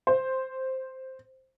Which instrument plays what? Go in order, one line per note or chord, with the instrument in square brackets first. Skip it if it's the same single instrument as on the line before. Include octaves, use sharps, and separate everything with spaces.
[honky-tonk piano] C5